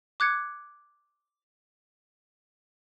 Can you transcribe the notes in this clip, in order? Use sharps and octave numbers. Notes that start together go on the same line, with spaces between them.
D6 F#6 G#6 C#7